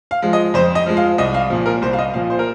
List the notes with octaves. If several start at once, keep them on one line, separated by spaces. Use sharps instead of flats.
F5
F3 G#3
D#5
F2 C5
D#5
F3 G#3
F5
C2 D#5
F5
A#2 F3
A#4
C2 C5
F5
D#5
A#2 F3 F5
C5
A#4